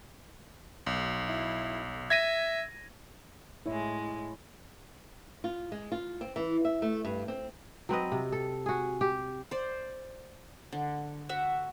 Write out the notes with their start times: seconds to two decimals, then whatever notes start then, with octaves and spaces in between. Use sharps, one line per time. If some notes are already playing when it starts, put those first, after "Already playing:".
0.87 B1
1.28 E4
2.10 E5 G#6 A#6 D#7
3.66 A2 G#3 E4 C#5
5.44 F4
5.72 G#3
5.92 F4
6.21 C4
6.36 E3
6.65 E5
6.82 A3
7.05 G2
7.28 C4
7.89 F#3 C4 B4 D#5
8.12 C3
8.32 A4
8.66 F#4 G#4
9.01 G4
9.51 C5 D5
10.73 D3
11.29 F#4 E5 F#5